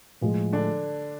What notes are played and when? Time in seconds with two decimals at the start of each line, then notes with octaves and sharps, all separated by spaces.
0.21 A2 F3 G#3
0.53 D3 D4